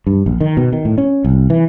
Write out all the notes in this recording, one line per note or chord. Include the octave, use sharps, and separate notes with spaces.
G2
A#1
D#3
B2
D#3
A2
C#4
C2
E3